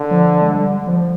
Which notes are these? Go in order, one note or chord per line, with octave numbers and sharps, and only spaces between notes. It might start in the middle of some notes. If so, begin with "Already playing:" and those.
Already playing: D3
F3
G#3
G3
F3